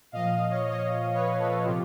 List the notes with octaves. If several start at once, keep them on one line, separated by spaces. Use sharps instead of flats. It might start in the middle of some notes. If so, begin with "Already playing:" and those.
A#2 F3 D#5 F5
C#5 D#5
C#5 D#5
B4 C#5
A4 B4
C3 F3 F4 G4